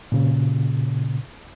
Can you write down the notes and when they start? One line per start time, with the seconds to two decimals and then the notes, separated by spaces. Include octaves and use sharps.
0.12 A#2 C#3